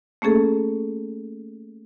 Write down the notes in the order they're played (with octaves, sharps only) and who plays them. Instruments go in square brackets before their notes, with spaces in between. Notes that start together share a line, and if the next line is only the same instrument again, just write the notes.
[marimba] A3 A#3 C#4 G#4 A4